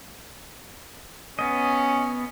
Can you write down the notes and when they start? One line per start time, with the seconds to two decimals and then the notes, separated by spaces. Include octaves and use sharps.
1.39 B3 C#4 D#5